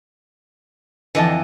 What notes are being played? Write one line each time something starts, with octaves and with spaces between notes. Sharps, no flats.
F2 D3 E3 D#5 A5